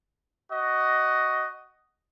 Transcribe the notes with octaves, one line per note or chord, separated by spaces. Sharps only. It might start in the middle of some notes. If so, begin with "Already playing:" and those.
F#4 D#5